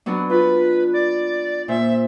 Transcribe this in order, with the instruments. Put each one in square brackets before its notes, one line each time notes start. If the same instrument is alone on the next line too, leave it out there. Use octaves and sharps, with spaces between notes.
[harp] F#3 B3 D4
[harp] F4 [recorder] B4
[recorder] D5
[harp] A#2 C5 [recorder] E5